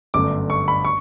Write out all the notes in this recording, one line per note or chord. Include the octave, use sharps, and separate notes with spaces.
G1 F#2 D3 A3 D6
C#6
B5
C#6